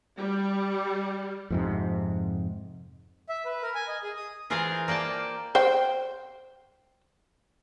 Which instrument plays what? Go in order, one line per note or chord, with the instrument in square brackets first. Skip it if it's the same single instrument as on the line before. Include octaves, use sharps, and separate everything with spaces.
[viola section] G3
[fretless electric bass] F2 G#2 C3
[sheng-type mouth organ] E5
B4
A#4
G#5
D#5
G#4
D#6
[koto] E3 F4 G#4 A#4 C5 F5
A#3 D5 G5 A5
[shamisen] C5 G5